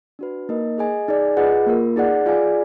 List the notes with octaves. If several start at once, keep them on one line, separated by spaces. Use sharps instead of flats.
D4 F#4 B4
A#3 D#4 A#4 D#5
G#4 D#5 G#5
D#4 G#4 D5 G#5
F4 G#4 B4 D#5 F#5
A#3 F4 A#4
D#4 G#4 D5 F#5
F4 G#4 D5 F5 G#5